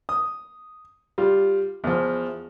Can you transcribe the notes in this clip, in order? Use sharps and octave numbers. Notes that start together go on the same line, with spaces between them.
D#6
G3 F4
E2 F3